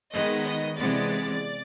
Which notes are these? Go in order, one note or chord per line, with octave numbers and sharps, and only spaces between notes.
D#3 G#3 B3 D#5
D#5
C3 E3 G#3 B3 D5